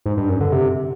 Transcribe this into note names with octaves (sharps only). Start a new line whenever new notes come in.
G#2
G2
F#2
D3
C3